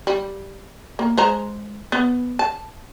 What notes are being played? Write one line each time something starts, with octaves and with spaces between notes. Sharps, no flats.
G3
A#3
G#3 C5 A#5
B3
A5